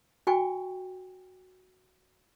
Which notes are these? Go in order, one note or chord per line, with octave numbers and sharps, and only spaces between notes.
F#4 G5 G#5 C#6